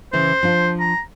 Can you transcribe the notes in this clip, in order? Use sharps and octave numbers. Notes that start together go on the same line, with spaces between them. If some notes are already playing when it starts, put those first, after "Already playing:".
C#3 E3 E4 C5
F3 D4 F4
A#5